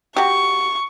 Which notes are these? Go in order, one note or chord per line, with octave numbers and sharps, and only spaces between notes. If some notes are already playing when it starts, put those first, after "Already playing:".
F#4 G4 C#6